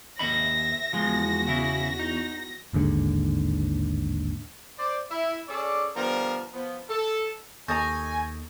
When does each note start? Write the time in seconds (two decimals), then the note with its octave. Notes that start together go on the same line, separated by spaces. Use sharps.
0.19 D#2 D#5 E5 B5 A#6
0.93 E2 F3 G#3 F#4
1.47 C#3 E4
1.99 D#4
2.73 A1 D#2 G#2 D3
4.79 C5 D5
5.11 E4 E5
5.49 C#4 G#4 A4 D5
5.95 D3 F3 G3 B3 F4 A#4
6.53 F3 B3
6.89 A4
7.68 D#2 A4 D#5 G#5 A#5 C#6 G6 A#6